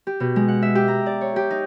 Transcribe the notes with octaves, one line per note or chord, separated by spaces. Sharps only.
G4
B2
G#3
F#5
E5
G4
A#5
D5
C#5
G4
D#4